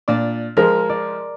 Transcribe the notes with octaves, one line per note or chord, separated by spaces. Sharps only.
A#2 D4 D5
F3 G#3 A#4
D5